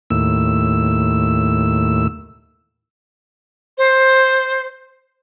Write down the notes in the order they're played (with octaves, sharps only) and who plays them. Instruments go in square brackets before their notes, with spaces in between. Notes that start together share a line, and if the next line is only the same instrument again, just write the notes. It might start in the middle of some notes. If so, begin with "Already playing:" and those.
[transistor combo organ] D#2 A2 E6
[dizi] C5